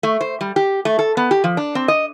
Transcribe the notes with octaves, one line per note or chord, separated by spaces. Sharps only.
A3
C5
G3
G4
A3
A4
B3
G4
F3
D4
C4
D#5